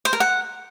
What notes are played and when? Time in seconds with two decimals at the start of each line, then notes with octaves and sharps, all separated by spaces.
0.05 C5
0.13 A#4
0.20 F#5